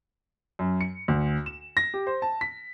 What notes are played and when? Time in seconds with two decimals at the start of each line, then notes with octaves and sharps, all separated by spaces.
0.59 F#2
0.81 C#7
1.08 D2
1.46 E7
1.77 A#6
1.94 G4
2.07 C5
2.22 A5
2.41 B6